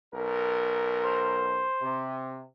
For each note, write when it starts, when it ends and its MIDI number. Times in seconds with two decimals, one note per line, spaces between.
0.13 1.68 35
0.13 1.68 70
1.04 2.00 72
1.81 2.42 48